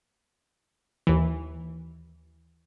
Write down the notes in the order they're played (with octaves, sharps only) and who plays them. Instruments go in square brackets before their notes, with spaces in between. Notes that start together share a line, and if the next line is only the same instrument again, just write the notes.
[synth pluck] D#2 E3